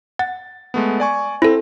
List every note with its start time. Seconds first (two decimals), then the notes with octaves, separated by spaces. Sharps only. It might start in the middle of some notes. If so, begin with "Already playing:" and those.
0.19 F#5 A6
0.74 G#3 A3 B3
1.00 D5 G#5 C#6
1.42 C4 E4 A4